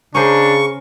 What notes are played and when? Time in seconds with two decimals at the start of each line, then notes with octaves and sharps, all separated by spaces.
0.15 C#3 C#4 D4 A#4 C5 C#6